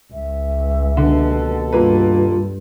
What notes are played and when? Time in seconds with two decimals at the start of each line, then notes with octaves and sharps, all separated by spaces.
0.13 C#2 E5
0.97 D#2 B2 D3 A4
1.73 G2 A#3 F4 B4